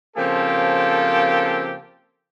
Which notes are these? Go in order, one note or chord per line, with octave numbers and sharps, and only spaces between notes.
C#3 F3 A#3 C4 G4 A4